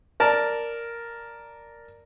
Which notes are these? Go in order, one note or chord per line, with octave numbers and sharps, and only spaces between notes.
A#4 D5 A5